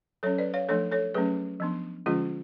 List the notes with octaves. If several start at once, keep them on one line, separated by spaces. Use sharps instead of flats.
F#3 C#4 A4 C#5
B4 D5
C#5 F5
F3 A3 D4 A4 C#5
A4 C#5
F#3 A3 C#4 G#4 B4
F3 B3 D4
D3 F3 G#3 C#4 F4 G#4